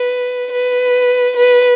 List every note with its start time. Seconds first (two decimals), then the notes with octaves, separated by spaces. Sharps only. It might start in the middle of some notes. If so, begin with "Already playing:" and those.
Already playing: B4
0.52 B4
1.36 B4